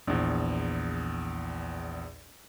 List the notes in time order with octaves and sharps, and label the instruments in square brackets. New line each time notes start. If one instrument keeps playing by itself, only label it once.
[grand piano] A#1 E2